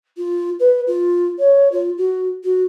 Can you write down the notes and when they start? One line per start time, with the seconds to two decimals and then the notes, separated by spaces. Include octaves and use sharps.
0.17 F4
0.59 B4
0.87 F4
1.39 C#5
1.72 F4
1.97 F#4
2.44 F#4